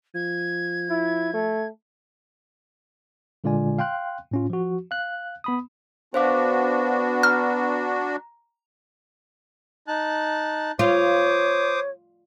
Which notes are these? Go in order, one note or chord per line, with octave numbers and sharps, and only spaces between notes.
F3 G#6
E4
A3
A#2 D3 G#3 F4 D5 G#5
F5 G5 C6 F#6
A2 C#4 F4
F3 F#4
F5 F#6
B3 B5 D#6
B3 D4 F#4 C5 F5 D6
A#5 F6
D#4 A5 F#6
F4 C5 C#5 D6 D#6